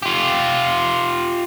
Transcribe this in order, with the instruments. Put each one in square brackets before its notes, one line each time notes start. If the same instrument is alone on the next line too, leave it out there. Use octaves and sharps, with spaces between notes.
[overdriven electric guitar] F4 G4